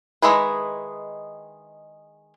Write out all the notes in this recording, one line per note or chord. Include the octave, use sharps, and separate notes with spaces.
D#3 G#3 E4 G#4 B4